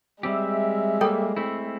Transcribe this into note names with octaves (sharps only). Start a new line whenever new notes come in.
G3 G#3 C4 G4 E5
G3 A#3 A4 C#5 G5
A3 C4 E4